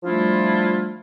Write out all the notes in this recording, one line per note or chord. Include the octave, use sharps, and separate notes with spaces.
F3 G3 A3 D4 E4 F4